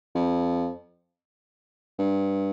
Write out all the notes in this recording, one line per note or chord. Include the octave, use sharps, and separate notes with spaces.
F2
G2